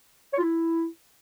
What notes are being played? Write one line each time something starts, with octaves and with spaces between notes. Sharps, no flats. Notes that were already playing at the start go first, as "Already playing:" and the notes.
C#5
F4
E4